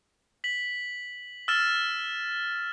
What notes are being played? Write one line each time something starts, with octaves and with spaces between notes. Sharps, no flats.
B6 F#7
E6 F6 A6 E7